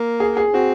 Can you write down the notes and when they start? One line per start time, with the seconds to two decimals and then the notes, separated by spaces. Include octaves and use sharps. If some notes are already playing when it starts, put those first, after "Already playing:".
Already playing: A#3
0.20 G#4
0.37 G#4
0.53 C4 F#4